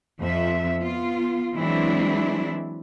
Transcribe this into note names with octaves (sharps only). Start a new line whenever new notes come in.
F2 F3 E5
B3 F4
E3 F#3 G#3 C4 D4 E4